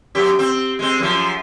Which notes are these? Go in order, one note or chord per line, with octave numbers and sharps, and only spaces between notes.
F#2 F#3 G4
C4
G#3 C4
F#2 F3